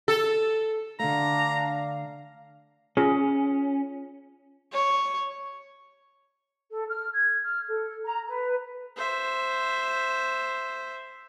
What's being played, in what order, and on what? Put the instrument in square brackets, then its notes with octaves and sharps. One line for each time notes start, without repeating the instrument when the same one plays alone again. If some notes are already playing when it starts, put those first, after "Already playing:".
[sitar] A4
[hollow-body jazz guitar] D3 A3 [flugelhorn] D4 [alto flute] F5 [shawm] A#5
[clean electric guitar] C#4 [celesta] F4 [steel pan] G#4
[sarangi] C#5
[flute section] A4
F6
G#6
F6
A4
A#5
B4
[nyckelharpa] C5 E5